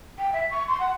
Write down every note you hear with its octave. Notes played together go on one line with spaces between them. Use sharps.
G5
E5
C#6
C6
F#5